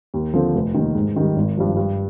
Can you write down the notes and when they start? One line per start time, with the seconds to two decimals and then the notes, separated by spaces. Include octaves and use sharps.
0.14 D#2
0.34 D3 F3 C4
0.55 F1
0.75 D#2 D#3
0.95 G#2
1.16 D#3 G3
1.36 G#1
1.57 G2 F3
1.77 G2